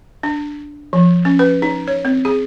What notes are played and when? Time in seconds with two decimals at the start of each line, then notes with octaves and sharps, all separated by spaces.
0.23 D4
0.93 F3
1.25 C#4
1.39 B4
1.62 D#4
1.88 C#5
2.05 C4
2.25 G#4